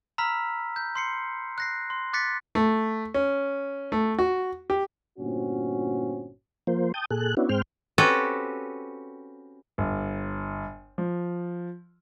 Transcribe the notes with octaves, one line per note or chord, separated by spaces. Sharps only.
A#5 B5 E6 F6 B6
G6
C6 C7 C#7
F#6 A#6 C7
C6
D6 F#6 A6 B6 C#7
A3
C#4
A3
F#4
G4
G1 A#2 C4 C#4 F#4
F3 A#3 C5
G5 A5 D#6 G6
A#2 G#4 A4 F#6
B3 C#4 D4 E4 F#4
G#2 G#3 C4 C5 G5 F6
C4 C#4 F#4 G4 A4 B4
G1
F3